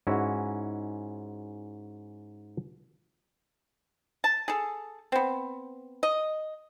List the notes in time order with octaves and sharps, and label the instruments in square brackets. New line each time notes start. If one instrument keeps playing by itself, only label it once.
[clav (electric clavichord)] G#2 C#4 E4 F#4
[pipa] A5
G#4 A4
B3 C4
D#5